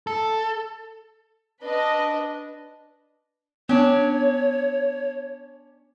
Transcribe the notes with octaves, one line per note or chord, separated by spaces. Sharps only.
A4
D4 B4 D#5
B3 C#4 D4 C#5